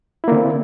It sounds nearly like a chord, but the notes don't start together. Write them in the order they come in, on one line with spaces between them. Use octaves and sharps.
E4 A#3 D3 C4